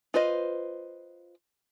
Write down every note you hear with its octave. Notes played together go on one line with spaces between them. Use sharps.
F4 B4 C5 D#5